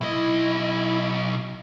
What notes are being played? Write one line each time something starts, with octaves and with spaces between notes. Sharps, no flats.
B1 E4 D#5